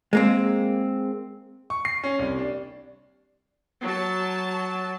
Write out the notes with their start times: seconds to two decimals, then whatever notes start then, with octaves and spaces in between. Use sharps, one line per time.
0.13 G#3 A#3 C4
1.70 C#6
1.85 C7
2.04 C#4
2.19 C2
2.38 D4
3.82 F#3 A5